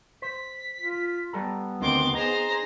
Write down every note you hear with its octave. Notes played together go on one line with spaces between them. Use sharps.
C5 B6
F4
G3 B3 A4 A#5
D2 D#3 C4 C6 D6
D#4 G#4 C5 A#5